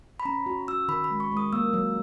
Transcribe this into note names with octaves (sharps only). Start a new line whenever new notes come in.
B5
C#4 A#5
F#4
F#4 E6
D#3 B5
B5
G#3
C#6
G#3
D#6
A#3 E6
F#3